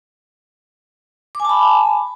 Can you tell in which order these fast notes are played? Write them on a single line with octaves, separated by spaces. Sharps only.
D6 G#5 A5 B5